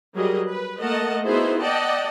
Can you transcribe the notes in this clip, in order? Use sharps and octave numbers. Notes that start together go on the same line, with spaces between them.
F#3 G3 G#4 A#4 D#5
B4
A3 A#3 A#4 D#5 F#5 A5
B3 D#4 E4 F#4 G#4 C5
D5 D#5 F#5 G5 A5